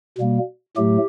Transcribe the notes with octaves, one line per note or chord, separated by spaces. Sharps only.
B2 G3 A#3
A2 F#3 A3 G4